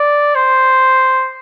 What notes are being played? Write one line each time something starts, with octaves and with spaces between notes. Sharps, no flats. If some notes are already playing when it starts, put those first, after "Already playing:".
Already playing: D5
C5